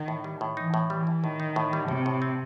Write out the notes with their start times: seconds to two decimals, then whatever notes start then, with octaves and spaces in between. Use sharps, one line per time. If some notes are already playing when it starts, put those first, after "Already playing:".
Already playing: D#3
0.08 A2
0.24 G3
0.41 A2
0.57 E3 D#4
0.74 A2
0.90 E3 G3
1.07 G3
1.23 A2 D#3
1.40 D#4
1.56 A2
1.73 G3
1.88 A2 C3
2.06 A2
2.22 C4